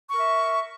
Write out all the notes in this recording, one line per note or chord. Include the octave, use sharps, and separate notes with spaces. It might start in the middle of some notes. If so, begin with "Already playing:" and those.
A#4 E5 C#6